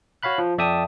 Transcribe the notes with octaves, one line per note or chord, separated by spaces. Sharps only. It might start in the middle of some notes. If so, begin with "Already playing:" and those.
F#4 C#5 F5 B5 F#6
F3
F2 D5 E5 G5 A5 D#6